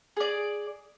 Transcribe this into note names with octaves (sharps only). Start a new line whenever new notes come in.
G#4 D5